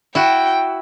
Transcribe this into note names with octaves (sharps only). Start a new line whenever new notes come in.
E4 F#4 G5